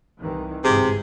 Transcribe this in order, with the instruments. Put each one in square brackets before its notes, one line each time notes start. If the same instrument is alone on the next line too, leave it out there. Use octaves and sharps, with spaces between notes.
[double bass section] C2 D#3 E3
[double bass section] G1 G#2 E3 [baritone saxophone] C3 [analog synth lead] G#4